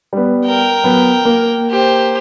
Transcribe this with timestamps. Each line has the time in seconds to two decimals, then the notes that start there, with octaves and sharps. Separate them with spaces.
0.13 G3 B3
0.45 A#4 G5
0.84 F#3 B3
1.25 A#3
1.70 G4 C5